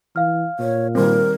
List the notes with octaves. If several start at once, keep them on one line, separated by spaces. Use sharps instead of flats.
E3 F5 F6
A#2 C#5
D#3 G3 C4 A#4